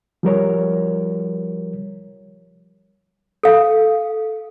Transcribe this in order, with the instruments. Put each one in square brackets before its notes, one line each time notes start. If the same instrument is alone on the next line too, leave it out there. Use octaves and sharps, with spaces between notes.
[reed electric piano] F3 G3 A#4 C#5
[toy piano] A4 F5